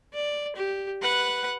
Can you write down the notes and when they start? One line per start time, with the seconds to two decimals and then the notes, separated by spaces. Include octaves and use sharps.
0.14 D5
0.56 G4
1.02 B4 F#5